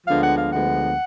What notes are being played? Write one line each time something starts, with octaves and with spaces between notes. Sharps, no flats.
D2 D3 F3 G#3 B3 F5
F#5
F5
D2 D3 F3 G#3 B3 F#5